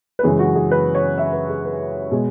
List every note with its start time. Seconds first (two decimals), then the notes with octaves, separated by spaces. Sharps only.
0.19 B4
0.23 F#2 C#3 E3 G#3 G#4
0.39 F#4
0.56 G#4
0.71 B4
0.95 C#5
1.18 E5
1.33 B4
1.49 G#4
1.65 B4
2.11 B2 G#3